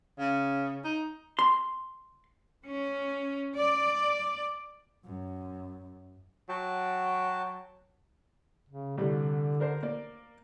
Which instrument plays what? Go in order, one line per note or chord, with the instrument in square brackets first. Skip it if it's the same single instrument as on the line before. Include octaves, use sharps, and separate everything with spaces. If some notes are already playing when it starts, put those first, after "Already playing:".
[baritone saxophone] C#3
D#4
[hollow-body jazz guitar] C6
[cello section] C#4
D5
[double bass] F#2
[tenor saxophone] F#3 [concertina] F#4 G5 A5
[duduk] C#3
[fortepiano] C2 G3 [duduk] D3
[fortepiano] D4 A#4 C5
A#3 D5